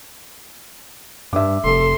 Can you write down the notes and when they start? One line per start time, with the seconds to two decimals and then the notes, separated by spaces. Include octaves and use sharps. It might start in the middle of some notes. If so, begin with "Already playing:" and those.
1.33 G2 E5 D6
1.64 F1 A4 C6